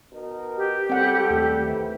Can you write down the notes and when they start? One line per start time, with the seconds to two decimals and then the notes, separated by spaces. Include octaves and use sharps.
0.12 B2 D#4 A#4
0.57 G4
0.89 C#2 G3 C4 A4 F#5
1.30 D#2 A3
1.63 C3 D#3 E3